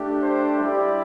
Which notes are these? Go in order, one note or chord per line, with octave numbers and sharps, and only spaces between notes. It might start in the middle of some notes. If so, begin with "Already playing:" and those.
Already playing: A3 D4 G4
C5
G3 E4 G4 D5